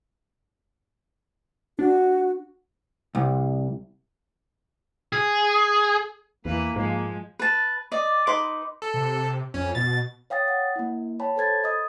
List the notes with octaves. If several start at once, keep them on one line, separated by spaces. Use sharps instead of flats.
D4 F#4
C2
G#4
E2 E3 A#3 B4
G#2 F3 G#3
B4 A5
D5 D#5
D#4 B4 C6 D6
A4
C3
F2 C#4
B2 A6
C#5 F5 G5 D#6 A6
F#5
A#3 E4
C#5 G5 A5 B5
A4 C5 B5 G#6 A6
D#5 D#6